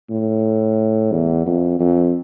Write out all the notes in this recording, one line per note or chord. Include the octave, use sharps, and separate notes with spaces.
A2
E2
F2
F2